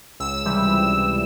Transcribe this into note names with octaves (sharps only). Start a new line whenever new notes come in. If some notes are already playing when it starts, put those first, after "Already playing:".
C#2 E6
C3 E3 G3